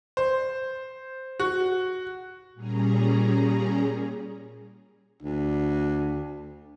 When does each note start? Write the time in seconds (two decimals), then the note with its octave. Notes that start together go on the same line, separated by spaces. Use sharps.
0.17 C5
1.40 F#4
2.54 A#2 G3 C#4 G#4 A#5
5.22 D2 D4